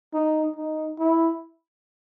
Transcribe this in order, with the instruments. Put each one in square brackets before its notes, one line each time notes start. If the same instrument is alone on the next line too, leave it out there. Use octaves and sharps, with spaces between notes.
[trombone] D#4
D#4
E4